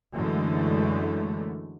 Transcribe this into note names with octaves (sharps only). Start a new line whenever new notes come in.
F#2 D3 E3 G#3 A3